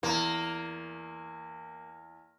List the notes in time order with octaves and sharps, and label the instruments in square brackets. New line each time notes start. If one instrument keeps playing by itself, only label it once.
[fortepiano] E2 [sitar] A#3